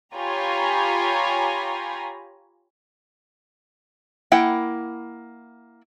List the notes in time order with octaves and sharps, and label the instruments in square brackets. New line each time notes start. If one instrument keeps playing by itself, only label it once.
[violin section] F4 G4 C#5 G#5 A#5 B5
[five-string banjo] A#3 E4 F#5 G5